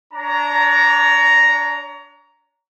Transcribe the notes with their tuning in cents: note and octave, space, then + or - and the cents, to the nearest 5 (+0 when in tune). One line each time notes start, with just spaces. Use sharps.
D4 -15 C#5 +35 A#5 +0